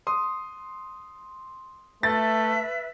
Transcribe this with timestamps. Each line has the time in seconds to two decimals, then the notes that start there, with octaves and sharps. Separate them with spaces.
0.07 C6 D#6
2.03 A3 B4 E5 A6